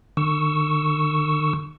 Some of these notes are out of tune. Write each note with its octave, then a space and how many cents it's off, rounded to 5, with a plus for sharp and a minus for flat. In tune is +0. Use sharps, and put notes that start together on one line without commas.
D#3 -45 C#6 +0 E6 +0